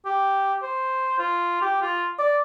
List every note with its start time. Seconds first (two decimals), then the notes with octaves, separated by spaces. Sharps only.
0.06 G4
0.62 C5
1.19 F4
1.62 G4
1.82 F4
2.19 D5